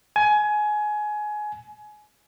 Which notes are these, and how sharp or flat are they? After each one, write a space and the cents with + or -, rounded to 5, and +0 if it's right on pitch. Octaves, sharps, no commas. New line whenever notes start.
G#5 +20